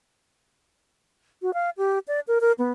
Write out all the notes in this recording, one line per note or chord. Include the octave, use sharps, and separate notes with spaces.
F#4
F5
G4
D5
A#4
A#4
B3